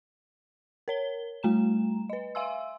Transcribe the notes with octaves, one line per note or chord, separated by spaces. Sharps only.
A#4 C#5 G7
G3 A3 A#5 E7
B4 D#5
E5 F5 G#5 C6 E6